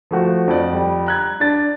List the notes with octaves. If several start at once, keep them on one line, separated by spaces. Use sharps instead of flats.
F3 A3 F#4
F2 D5
G3
A#5 F#6 G#6
D4 A6